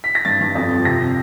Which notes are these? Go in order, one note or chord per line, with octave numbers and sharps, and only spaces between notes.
B6
A#6
G2 A6
G2
F2
F3
C3 A#6